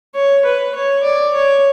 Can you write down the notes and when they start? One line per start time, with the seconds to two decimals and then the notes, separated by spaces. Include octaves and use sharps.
0.15 C#5
0.45 B4
0.75 C#5
1.03 D5
1.34 C#5